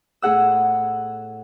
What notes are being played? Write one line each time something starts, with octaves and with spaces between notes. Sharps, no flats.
A2 G#4 F#5 E6